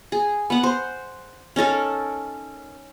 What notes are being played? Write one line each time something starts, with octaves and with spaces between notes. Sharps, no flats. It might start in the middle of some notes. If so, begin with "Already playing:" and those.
G#4
B3 F#5
C5
C#4 D#4 A4 A#4